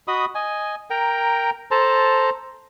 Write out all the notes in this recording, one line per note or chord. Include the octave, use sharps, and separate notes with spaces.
F#4 D#5 B5 D#6
D#5 G#5
A#4 G5 A#5
A4 C5 A5 A#5